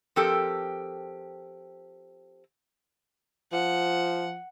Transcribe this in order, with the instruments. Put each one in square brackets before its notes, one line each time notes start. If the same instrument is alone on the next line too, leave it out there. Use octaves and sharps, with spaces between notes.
[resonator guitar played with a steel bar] F3 C4 G4 A4 A#4
[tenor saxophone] F3 [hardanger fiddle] F#5